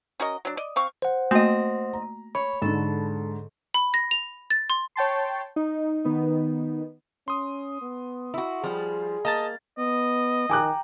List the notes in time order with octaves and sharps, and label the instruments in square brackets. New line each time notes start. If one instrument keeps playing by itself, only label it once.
[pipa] C#4 F#4 A#4 D#5
F#3 D4
D5 D#5
C4 F5 C#6
[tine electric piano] C5 F#5
[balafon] A3 A#3 F#4 [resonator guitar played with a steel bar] C4 D#5
[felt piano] A#5
[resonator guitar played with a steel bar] C#5 [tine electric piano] B5
[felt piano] G#2 D3 [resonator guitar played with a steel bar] A4
[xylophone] B5
A#6
F7
A6
C6
[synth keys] C#5 G5 A5 C6
D#4
D#3 B3 D#4
[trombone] C#4 [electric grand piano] C6 D#6
[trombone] B3
[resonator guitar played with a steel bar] E4 F#4
[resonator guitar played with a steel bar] F3 G3 [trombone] G#4
[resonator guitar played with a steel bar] A#3 [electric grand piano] D#5 A5 A6
[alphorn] B3 [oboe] D#5
[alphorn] D#3 [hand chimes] G5 A#5 [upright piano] G#5 D6 F#6